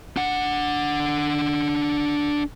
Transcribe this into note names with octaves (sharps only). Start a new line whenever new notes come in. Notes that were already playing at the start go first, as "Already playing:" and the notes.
D4 F#5